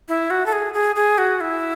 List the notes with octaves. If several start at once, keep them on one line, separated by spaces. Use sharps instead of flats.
E4
F#4
A4
G#4
G#4
G#4
F#4
E4